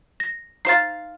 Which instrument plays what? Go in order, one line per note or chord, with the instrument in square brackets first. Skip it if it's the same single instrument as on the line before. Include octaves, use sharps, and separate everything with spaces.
[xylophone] A#6
[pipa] D#4 C5 F5 [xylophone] A6 C7